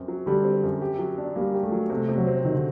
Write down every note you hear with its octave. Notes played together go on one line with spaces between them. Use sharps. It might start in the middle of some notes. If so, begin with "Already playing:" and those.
Already playing: F#2 C4
F#3
D3 G3
C4
F#2
G4
F#3
D4
G3 A#3
G4
A3
F#3
C3 A3
C3
F#3
C4
D#3 F#3
D3